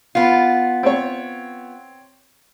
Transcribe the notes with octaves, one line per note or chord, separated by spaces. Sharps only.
B3 F4
C4 C#5